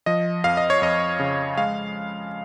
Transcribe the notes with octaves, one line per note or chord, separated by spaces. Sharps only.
F3 D#5
F2 F5
D#5
C#5
F2 D#5
C#3
G#3 F5